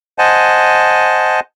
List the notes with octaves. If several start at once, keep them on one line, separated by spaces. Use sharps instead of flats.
C5 D#5 F#5 G#5 A5